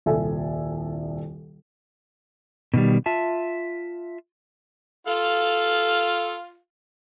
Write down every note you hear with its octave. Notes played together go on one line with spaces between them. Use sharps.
D#1 C2 A4 E5 G#5
B2 D#3 G3
F4 E5 A5
F4 A4 F5